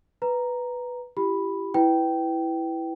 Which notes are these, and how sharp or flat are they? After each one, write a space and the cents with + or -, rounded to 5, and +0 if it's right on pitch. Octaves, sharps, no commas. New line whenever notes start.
B4 +0 A#5 +0
E4 +45 G4 +0 B5 +0
E4 +0 B4 +10 G5 -15